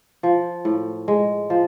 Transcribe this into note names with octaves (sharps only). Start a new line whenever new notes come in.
F3
A2
G#3
F3